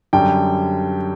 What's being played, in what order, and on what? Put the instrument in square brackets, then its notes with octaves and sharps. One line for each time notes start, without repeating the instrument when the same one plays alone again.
[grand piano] F#2 D3 G3 G5